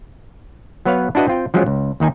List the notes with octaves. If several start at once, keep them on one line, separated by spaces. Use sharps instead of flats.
F#3 B3 B4 C#5 F5
D4 E4 F#4 B4 D#5
C4 F4 G5
F3 F#3 G#3 C#4 F4
C#2
D#2 D#3 D#4 G#5